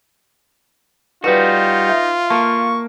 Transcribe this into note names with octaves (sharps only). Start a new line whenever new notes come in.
G3 D#4 F4 F#4 A4 B4
E5
A#3 A4 A5 C#6